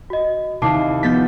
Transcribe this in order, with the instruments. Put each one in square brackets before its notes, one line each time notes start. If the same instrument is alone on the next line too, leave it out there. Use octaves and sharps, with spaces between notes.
[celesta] F#4 D#5
[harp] D#2 [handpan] C3 E4 [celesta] A5 D6 C7
[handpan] F3 B3 [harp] G6 A6 B6